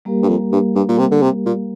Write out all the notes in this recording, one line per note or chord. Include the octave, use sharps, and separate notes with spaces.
G3 A#3 G4 A#4 F5
G2
F2
G2
G2
A#2
C3
D3
C3
A#2